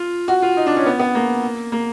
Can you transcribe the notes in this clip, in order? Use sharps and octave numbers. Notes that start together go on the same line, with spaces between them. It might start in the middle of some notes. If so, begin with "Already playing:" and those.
Already playing: F4
F#4
F4
D#4
D4
C#4
B3
B3
A#3
A#3